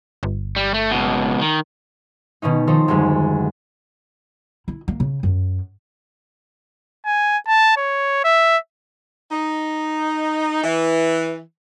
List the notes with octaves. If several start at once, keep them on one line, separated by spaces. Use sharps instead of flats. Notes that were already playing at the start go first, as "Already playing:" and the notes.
G1
G3
A3
C#2 B2
D#3
B2 D#3 C#4 D#4
D#3 F3 D#4 A4 C5
D#1 F#2 D3 G#3
E4
A#3
C#3
F#2
G#5
A5
C#5
E5
D#4
E3